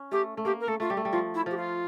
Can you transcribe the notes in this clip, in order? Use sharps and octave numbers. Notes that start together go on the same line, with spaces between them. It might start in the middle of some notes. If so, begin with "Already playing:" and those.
Already playing: C#4
A3 G4
A3
A#3 G4
A#4
A3 A4
A3 F4
G3 G4
A3
G3
F3 F4
E4
F3 G4
F4